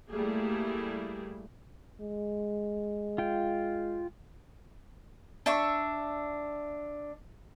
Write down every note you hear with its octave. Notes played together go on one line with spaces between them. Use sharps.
G3 A3 A#3 E4 G#4
G#3
F4 G5
D4 E5 C#6